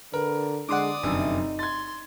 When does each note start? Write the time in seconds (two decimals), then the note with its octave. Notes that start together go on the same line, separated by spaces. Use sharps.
0.14 D3 A#4 B4
0.69 D3 G#3 D5 F#5 C6 D6 D#6
1.03 F1 F#2 D3 D#4 E5
1.59 C6 G#6 A6